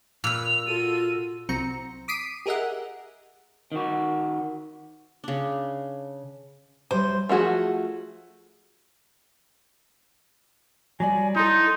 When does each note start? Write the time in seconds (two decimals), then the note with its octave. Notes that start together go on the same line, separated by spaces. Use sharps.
0.24 A#2 B4 E6 F7
0.67 F4 F#4 A4 D#7
1.49 C2 F#3 C4 A#5 C#7
2.08 D6 D#6 B6 C7 D7 D#7
2.46 G4 G#4 A#4 D#5 E5 F#5
3.72 D#3 F#4
5.24 C#3 D4
6.91 F#3 G3 A3 C5
7.29 F3 A3 F#4 G#4
11.00 F#3 G3 D5 G#5
11.36 D#4 E4 A4 C6